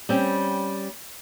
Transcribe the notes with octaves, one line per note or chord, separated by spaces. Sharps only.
G3 C4 C#4